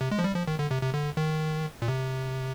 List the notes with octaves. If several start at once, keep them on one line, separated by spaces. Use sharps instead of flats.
C3
G#3
F3
G3
F3
D#3
D3
C3
C3
D3
D#3
A#2
C3